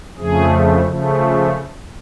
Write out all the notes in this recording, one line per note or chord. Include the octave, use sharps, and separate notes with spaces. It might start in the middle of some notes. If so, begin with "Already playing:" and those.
F2 C#3 F3 A3 G#4
C#3 F3 A3